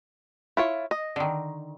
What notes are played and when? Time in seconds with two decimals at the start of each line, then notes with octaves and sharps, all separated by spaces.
0.57 E4 F4 C#5
0.91 D#5
1.16 D3 D#3